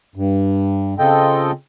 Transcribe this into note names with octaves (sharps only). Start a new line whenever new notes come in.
G2
C#3 C4 F4 A4 D#5 G5